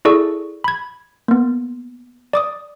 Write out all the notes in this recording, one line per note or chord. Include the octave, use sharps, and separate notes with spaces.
E4 G#4 A4 D5 C#6 E6
B5 G#6
A#3 B3
D5 D6 D#6